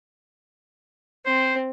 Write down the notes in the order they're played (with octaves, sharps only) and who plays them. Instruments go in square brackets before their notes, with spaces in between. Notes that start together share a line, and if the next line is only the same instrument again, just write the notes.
[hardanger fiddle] C4 [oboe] C5